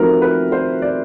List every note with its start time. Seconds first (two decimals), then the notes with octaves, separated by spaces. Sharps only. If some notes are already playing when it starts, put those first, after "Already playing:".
Already playing: F3 A3 C4 D#4 F#4 A#4 B4
0.22 B4
0.52 C5
0.82 D5